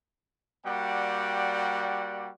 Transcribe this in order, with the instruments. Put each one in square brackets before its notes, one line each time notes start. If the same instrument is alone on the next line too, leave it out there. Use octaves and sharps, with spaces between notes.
[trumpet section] G3 A#3 F#4 D5 F#5 G5